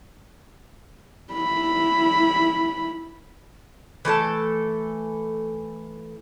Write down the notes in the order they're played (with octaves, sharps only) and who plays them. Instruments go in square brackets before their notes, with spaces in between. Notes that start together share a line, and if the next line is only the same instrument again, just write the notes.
[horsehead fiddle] E4 B5
[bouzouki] E3 A3 A4 A5